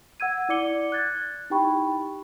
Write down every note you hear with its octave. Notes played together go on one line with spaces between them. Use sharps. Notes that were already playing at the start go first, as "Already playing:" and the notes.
F#5 E6 G#6 D#7
E4 D5 D6 C#7 G7
F#6 G#6 A6
D#4 E4 G4 G5 B5 C#6